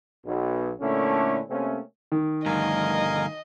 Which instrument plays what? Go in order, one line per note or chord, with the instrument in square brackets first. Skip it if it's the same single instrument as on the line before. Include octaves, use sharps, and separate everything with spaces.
[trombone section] B1 B2
A#2 D3 A3 C#4 D4 E4
C3 A3 A#3 C4 C#4
[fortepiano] D#3
[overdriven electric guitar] D2 G2 [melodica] A#4 F5 G#5 [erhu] D#5